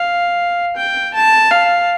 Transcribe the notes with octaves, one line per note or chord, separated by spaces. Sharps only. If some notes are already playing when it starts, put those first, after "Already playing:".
Already playing: F5
G5
A5
F5